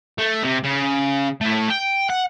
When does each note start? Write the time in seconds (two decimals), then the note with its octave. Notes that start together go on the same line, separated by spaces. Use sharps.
0.18 A3
0.43 C3
0.63 C#3
1.41 A3 E4
1.70 G5
2.10 F#5